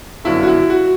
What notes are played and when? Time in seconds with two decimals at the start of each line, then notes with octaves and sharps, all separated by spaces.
0.24 G1 F#2 D3 F#3 E4
0.43 F#4
0.47 E4
0.70 F#4